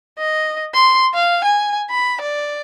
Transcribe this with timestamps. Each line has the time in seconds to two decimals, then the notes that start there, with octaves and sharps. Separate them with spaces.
0.18 D#5
0.74 C6
1.14 F5
1.45 G#5
1.90 B5
2.21 D5